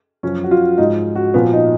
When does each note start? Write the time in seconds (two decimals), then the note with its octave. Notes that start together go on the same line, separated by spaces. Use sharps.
0.23 F#2 F3 C#4
0.44 F#4
0.51 F4
0.78 G#2 F3 D#4
1.15 F#4
1.34 A#2 F3 B3
1.53 D#4